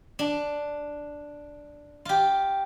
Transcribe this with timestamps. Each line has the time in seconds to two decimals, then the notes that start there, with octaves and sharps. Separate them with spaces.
0.19 D4
2.05 F4 G4